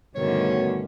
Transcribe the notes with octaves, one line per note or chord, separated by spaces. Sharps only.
G2 B2 D3 D#3 A3 C#4 C#5